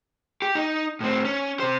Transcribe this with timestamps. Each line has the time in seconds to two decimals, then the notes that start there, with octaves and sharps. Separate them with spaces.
0.42 G4
0.55 D#4
1.00 A2 C4
1.25 C#4
1.60 C3 C5